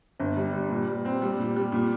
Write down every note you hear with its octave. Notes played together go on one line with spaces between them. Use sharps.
G1
G3
G3
A#2
G3
C4
G3
A#2
G3
A#2